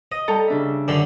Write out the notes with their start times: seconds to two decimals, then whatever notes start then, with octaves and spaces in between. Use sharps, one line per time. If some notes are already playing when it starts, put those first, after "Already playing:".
0.12 D#5
0.28 G3 A4 A#5
0.48 C#3 D4 E5
0.88 F#2 D3 D4